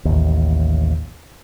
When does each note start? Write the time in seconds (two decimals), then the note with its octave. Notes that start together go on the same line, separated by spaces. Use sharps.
0.05 A1 D#2